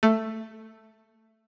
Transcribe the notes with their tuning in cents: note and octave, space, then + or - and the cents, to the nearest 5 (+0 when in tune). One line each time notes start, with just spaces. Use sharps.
A3 +10